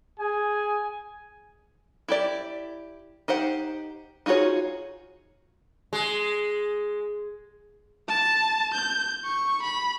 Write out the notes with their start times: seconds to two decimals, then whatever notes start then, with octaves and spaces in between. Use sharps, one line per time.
0.20 G#4 G#5
2.08 E4 G4 D5
3.28 D#4 G4 C5 F#5
4.26 D#4 F4 F#4 G#4 C#5
5.93 G#3
8.09 A5
8.74 G6
9.25 C#6
9.63 B5